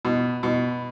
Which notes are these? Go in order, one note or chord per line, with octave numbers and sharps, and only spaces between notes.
B2
B2